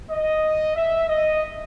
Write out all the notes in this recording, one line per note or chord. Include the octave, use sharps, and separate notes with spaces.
D#5
E5
D#5